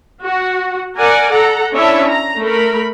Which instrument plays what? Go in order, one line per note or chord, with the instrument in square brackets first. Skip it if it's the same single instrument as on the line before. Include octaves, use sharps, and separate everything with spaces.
[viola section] F#4
A#4 D5 F#5 G#5
A4 F#5 A#5
C#4 D4 E4 C#5 E5 A5
A#5
A3 A#4 B5